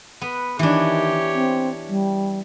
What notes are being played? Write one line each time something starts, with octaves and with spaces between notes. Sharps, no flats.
B3 B4
D#3 E3 D4 G4 C#5
C4
G3